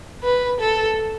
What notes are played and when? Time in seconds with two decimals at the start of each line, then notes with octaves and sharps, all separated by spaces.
0.24 B4
0.60 A4